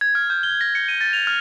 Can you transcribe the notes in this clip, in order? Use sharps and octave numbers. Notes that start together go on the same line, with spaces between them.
G#6
F6
G6
G7
A#6
C#7
D#7
A6
F7
F6